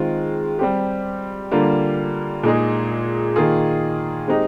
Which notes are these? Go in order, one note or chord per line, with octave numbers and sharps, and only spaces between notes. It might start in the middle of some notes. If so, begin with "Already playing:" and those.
Already playing: D#3 G#3 C4 F4
G3 C4 G4
D3 G3 A#3 F4
A#2 G#3 D#4 G#4
D#3 A#3 F4 G#4
G#3 C4 D#4 G4